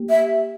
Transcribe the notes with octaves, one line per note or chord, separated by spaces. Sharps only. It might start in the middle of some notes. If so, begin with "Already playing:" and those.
Already playing: A#3 G4
E5